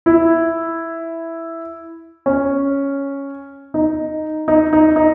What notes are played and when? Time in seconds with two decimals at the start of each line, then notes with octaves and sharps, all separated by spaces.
0.06 E4
2.26 C#4
3.74 D#4
4.48 D#4
4.73 D#4
4.96 D#4